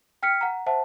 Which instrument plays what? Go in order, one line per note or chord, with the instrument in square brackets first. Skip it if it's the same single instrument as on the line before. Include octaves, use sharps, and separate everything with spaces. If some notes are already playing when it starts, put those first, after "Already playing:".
[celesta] G5 F6 B6 C#7
F#5 A#5
C5 E5 F#5 A5